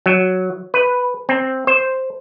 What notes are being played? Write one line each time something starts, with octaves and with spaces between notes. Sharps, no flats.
F#3
B4
C4
C5